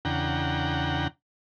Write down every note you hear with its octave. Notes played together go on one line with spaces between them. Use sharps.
E2 C#3 D4 F#5 G5 A#5